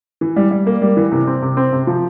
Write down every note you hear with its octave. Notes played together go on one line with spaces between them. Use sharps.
E3
G3
G3
A#3
G3
E3
C3
C4
C3
C4
C3
F3